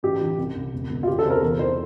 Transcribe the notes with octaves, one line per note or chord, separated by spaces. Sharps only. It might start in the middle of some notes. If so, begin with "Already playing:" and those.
A1 G4
E3
C2
C2
E1
E1
F4
E1 G4
A4
C3 C5
A#4
E2 A#4
E3 C5